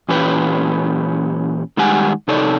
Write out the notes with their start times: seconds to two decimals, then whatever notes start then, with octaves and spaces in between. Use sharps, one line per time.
0.09 A#2 E3 C#4 G4 B4
1.77 D#3 G3 G#3 G4 F#5 G#5
2.28 C3 D#4 A4 C#5 D5